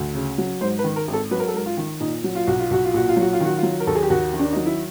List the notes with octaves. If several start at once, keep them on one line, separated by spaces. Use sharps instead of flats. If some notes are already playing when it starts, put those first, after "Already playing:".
Already playing: D2
C#3
F#3
G#2 C5
B4
D#3
A#4
G#1
A4
F#3 B4
A#4
A4
G#2 A#4
F4
D#3
A#2 D#4
F#3
F4
B1 F#4
F4
B1 F#4
F4
A#2 F#4
F4
F#3 F#4
F4
D#3 F#4
F4
F#3
A#4
D#2 A4
G#4
G4
D#2 F#4
D#3
D4
F#3 D#4
E4